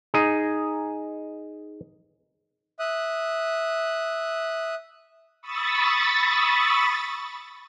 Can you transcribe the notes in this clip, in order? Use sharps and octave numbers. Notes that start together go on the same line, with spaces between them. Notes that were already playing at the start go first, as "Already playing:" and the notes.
D#4 G#4
E5 D#6 F#6
B5 C#6 D#6 E6 A6